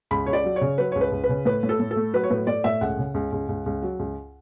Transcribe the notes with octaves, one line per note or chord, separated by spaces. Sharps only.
C#2 B5
C#2 C#5
D5
F#3
C#5
C#3
F#3 B4
C#2 C#5
B4
C#2
B4
C#3
A2 B4
A2
A4
A2
A4
A3
F#3 B4
C#5
A2 B4
A2 D5
A2 E5
C#2 F#5
C#3
C#2
C#2
C#2
C#2
F#3
C#2